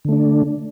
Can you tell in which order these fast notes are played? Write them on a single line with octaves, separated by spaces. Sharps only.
D3 A3 D4